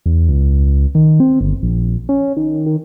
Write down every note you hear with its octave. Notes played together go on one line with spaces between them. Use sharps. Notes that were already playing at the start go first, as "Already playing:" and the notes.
E2
C#2
D#3
C4
G1
A#1
C#4
D#3
D#3